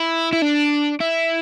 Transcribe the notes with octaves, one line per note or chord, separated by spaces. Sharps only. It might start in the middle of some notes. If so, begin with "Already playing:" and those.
Already playing: E4
E4
D4
E4